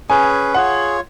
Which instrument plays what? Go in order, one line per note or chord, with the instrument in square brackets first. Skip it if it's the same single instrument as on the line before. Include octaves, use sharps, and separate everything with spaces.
[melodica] C#4 G#4 B4 [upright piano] G#5
[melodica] F4 G#4 C#5 [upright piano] F#5